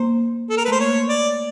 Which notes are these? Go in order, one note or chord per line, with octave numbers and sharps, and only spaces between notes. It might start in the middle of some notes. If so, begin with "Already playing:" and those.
Already playing: A#3 C5
A4
A#4
B4
A3 C5
A#3 C#5
D5